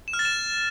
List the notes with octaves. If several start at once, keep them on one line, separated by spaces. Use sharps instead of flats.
E7
F6
A6
E7